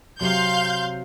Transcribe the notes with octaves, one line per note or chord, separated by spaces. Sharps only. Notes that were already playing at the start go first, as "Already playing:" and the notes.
C3 F#3 F5 C6 G6